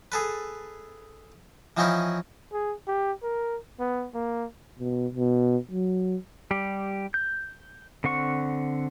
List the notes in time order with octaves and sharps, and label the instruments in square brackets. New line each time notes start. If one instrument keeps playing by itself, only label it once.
[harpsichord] G#4 A4 B4
E3 F3 C4 C#4 D#4 E4
[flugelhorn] G#4
G4
A#4
B3
A#3
[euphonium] B2
B2
F#3
[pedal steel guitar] G3 G4
G6
D3 C4 F#5 C#6